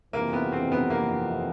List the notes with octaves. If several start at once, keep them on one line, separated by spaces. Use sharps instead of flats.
F2 C3 E3 A#3
B3
C4
B3
A#3